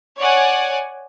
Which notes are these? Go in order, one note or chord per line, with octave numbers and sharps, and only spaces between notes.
C#5 D5 F#5 G#5